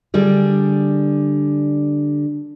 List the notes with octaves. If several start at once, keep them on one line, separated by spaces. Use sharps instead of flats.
D3 G3 G#4